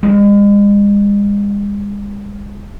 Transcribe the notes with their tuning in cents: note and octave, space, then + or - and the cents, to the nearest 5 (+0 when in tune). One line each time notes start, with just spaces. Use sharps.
G#3 -40